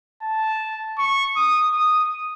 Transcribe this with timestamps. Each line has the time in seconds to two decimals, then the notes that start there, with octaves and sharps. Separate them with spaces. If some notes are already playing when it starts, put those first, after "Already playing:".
0.23 A5
0.98 C#6
1.36 D#6
1.74 D#6